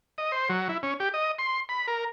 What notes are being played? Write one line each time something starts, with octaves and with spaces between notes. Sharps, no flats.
D#5
C5
F#3
E4
C#4
G4
D#5
C6
B5
A#4